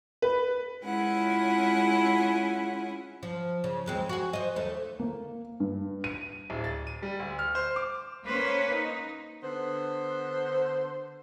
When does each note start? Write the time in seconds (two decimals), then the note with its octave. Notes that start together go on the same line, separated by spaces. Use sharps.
0.22 B4
0.85 G#3 C#4 E4 F4 F#5 G#5
3.23 F3
3.64 C#3
3.86 D#2 G#3 C4
4.09 F#4 G#4
4.33 C5 D#5
4.56 D#2 A3
5.00 A#3
5.60 G2
6.04 D#7
6.50 D1
6.64 A6
6.87 D#7
7.02 G3
7.19 D2
7.39 F6
7.55 C5
7.76 D6
8.25 A#3 C#4 B4 C5
8.71 D#4
9.42 D3 B3 C5